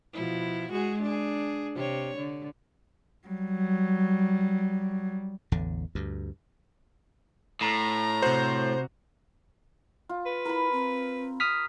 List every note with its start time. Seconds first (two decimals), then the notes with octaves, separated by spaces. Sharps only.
0.13 B2 F3 E4
0.71 G#3 F#4 G#4
1.02 D4 G#4
1.75 C3 C#5
2.17 D3
3.28 F#3 G3
5.52 A1 E2 D3
5.95 D2 G2
7.61 A2 A#5
8.22 C3 F#4 C5
10.09 F4
10.26 B4
10.45 E4 A#4 B5
10.72 C4
11.40 D#6 F6 B6